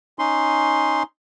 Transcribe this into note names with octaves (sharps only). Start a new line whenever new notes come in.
C#4 D#4 C6